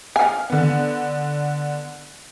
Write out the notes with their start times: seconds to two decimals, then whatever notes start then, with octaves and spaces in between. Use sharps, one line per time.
0.16 F5 G#5
0.50 D3 B3